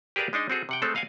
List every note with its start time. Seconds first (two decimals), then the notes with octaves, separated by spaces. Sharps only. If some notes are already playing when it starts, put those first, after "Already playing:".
0.16 G4 G#4 A#4 B4 D5 F5
0.33 G#3 D4 D#4 D#5
0.50 C4 F#4 G#4 A4
0.69 C3 F#5 G5
0.82 G#3 A3 C4 A4
0.95 D#5 F5 F#5 G#5